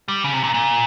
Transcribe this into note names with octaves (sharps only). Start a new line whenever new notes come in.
G3
C#3
C3
A#2
A#2